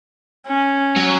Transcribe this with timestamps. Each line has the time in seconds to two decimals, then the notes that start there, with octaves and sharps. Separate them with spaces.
0.46 C#4
0.96 F#3